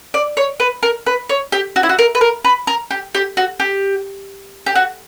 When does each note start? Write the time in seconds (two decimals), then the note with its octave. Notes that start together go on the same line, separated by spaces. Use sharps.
0.14 D5
0.37 C#5
0.60 B4
0.83 A#4
1.06 B4
1.29 C#5
1.52 G4
1.76 F#4
1.83 E4
1.89 F#4
1.99 A#4
2.15 B4
2.21 A#4
2.44 B4
2.67 A#4
2.91 G4
3.15 G4
3.37 F#4
3.60 G4
4.66 G4
4.75 F#4